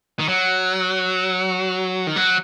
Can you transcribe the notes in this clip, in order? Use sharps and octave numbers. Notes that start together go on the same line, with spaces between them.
D#3
F#3
D#3
F#3